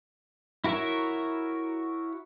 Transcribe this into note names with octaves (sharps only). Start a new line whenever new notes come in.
E4 F#4 A#4 C#5 E5